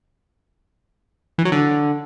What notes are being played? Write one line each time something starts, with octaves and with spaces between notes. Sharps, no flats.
E3
F#3
D3